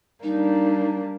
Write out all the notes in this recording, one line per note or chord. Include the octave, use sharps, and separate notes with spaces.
G3 A#3 D4 D#4